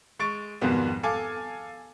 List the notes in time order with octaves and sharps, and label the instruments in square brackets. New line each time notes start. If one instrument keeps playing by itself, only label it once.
[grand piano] G#3 C#6 A6 D7
F2 G#2 B2 D#3 G3 B3
A4 F5 G#5 D6